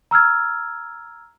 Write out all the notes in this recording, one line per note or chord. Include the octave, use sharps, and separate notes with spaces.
A#5 E6 F6 G#6